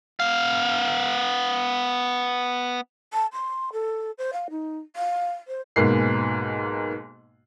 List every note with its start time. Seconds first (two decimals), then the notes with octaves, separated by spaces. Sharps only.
0.20 B3 F5
3.13 A5
3.32 C6
3.72 A4
4.18 C5
4.32 F5
4.50 D#4
4.96 F5
5.47 C5
5.76 B1 G#2 B2 A#3 C7